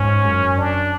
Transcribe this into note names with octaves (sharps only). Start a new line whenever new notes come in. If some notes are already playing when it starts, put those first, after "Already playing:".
Already playing: G#2 C#4
F#2
D4